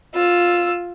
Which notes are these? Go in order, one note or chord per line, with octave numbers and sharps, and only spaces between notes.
F4 E6